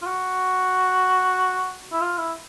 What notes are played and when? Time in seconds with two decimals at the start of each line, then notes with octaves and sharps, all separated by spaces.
0.02 F4
0.07 F#4
1.92 E4
2.01 F4
2.18 E4